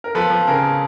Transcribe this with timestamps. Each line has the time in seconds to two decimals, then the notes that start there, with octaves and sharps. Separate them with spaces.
0.04 A#4
0.15 F3 A4 B4
0.30 F3
0.47 C#3 G#4 A#4